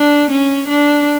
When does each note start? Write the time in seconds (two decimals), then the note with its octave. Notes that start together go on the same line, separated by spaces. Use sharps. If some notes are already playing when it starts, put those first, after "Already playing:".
Already playing: D4
0.31 C#4
0.68 D4